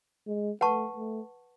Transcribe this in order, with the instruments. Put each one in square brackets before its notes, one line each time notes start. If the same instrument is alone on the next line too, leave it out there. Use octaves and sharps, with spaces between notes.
[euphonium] G#3
[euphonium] A3 [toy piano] B4 F#5 A5 C#6
[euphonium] A3